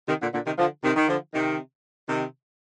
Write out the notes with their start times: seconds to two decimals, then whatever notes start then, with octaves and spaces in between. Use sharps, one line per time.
0.08 C3 D#3
0.21 A#2 D3
0.33 A#2 D3
0.45 C3 D#3
0.58 D3 F3
0.83 C3 D#3
0.96 D#3
1.08 D3 F3
1.34 C3 D#3
2.08 C3 D#3